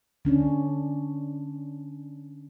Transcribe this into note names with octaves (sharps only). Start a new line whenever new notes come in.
D3 C#4 D4